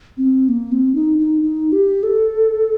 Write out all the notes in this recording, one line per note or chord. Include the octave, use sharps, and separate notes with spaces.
C4
A#3
C4
D#4
D#4
D#4
G4
A4